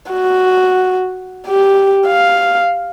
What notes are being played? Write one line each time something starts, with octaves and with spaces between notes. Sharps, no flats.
F#4
G4
F5